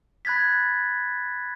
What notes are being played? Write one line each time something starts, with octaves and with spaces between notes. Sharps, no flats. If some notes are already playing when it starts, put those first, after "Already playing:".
B5 F#6 G#6 A6 B6